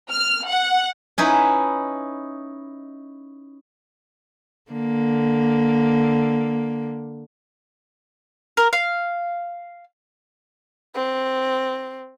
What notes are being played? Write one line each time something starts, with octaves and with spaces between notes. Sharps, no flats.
F6
F#5
C#4 D#4 E4 B4
D3 A#3
A#4
F5
C4